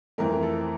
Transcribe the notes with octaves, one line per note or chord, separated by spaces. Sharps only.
F2 E3 A3 C4 A#4
A4